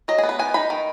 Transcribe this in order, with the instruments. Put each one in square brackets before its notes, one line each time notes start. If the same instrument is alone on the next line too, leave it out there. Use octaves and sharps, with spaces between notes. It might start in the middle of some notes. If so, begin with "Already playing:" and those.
[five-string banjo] F#3 D#5
B3 G#4
B4
D#3 G#5
D#4 B5
D#3